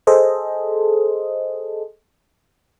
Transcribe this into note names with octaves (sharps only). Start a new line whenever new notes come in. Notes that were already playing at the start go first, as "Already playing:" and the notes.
G#4 A4 C5 D#5